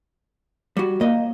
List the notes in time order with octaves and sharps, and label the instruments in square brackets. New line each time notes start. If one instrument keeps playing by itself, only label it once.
[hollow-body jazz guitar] G3 F#4
[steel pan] A#3 [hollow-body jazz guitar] D#5